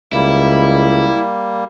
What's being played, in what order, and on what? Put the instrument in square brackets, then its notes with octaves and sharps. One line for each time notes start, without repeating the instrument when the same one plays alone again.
[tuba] C#2 [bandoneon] G3 A#3 [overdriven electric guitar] E4